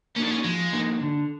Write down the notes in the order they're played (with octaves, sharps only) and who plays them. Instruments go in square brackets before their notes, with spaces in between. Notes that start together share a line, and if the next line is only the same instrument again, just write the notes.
[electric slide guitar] A#3 [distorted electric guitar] C#4
[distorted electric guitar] D4 [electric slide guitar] D#4 F#4
[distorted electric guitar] C#4
[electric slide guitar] F3 [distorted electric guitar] G#3
[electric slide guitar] A#3 D#4 F#4
D3